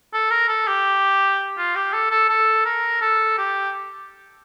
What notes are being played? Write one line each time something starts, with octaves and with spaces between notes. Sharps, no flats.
A4
A#4
A4
G4
F4
G4
A4
A4
A4
A#4
A4
G4